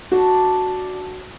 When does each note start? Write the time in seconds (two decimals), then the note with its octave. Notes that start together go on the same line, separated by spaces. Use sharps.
0.12 D4 F#4